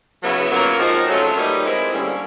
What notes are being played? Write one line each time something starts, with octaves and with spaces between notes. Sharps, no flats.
C#3 F#3 B3 E4
F#3 A#3 C#4 F4 A#4
F3 G#3 C4 D#4 F#4
F#3 A3 C#4 F4
G3 A#3 D#4 G4 B4
G#3 C4 E4
D3 G3 A#3 C#4